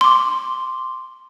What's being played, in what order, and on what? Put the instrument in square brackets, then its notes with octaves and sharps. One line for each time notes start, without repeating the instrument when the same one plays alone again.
[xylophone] C6 D6